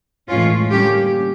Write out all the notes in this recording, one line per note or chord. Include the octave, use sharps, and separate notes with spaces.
A2 E3 G#3 C#4 F4
D3 G3 A#3 C#4 G4